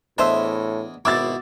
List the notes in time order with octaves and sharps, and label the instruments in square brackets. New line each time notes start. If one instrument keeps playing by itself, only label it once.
[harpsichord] E2 D#5 [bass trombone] A2 [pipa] D4 C5 E5
[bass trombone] G#1 [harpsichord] B2 E4 [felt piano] D6 E6 A6